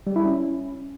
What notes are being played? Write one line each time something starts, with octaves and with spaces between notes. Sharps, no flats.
G3
E4
C#4